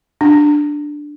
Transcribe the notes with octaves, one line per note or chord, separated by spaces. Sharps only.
D4